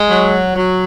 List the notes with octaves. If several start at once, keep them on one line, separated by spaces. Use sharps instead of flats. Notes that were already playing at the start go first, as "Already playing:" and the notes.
Already playing: G#3
F#3
F#3